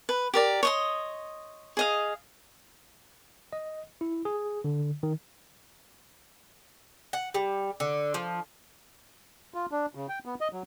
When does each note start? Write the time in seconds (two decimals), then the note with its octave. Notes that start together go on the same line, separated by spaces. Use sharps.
0.09 B4
0.34 G4 A#4 D5
0.63 C#5 D#5 C6
1.77 G#4 D#5 F5
3.53 D#5
4.01 E4
4.25 G#4
4.64 D3
5.03 D#3
7.13 F#5
7.34 G3
7.80 D3
8.14 F3
9.54 F4
9.71 D4
9.95 C#3
10.09 G5
10.26 B3
10.41 D#5
10.53 F#3